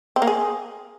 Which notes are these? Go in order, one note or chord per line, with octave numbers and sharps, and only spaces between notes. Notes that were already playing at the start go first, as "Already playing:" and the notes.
C4
A#3
G#4